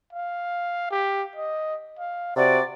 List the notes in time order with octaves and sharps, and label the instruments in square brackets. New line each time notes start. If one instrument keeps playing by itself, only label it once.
[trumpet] F5
G4
D#5
F5
[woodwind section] C3 D5 [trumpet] F#4